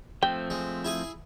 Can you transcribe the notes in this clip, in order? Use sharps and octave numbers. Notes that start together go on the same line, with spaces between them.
F3 A3 C4 G5
G#3
E4 G#4 G#5